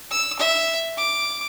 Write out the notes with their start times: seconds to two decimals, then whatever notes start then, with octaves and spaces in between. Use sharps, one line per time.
0.11 E6
0.39 E5
0.98 D6